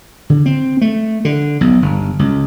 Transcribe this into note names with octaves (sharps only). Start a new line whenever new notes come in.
D3
C4
A3
D3
B1
G1
C#2